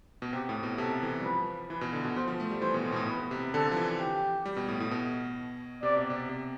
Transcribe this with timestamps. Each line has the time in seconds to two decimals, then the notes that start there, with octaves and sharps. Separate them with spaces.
0.22 B2
0.33 C3 G4
0.49 A2
0.63 B2
0.78 C3 A4
1.02 E3
1.20 G3
1.25 F3 B4
1.70 E3 B4
1.81 B2
1.93 D3
2.04 B2
2.16 B2 C5
2.28 F3
2.40 A3
2.51 G3
2.62 E3 C5
2.74 B2
2.85 A2
2.92 B2
2.96 A2
3.07 B2 B4
3.31 C3
3.54 D3 A4
3.72 F3
3.76 E3
4.00 G4
4.46 G3
4.57 B2
4.68 A2
4.80 A2
4.91 B2
5.83 C3 D5
5.96 B2
6.10 C3
6.29 C3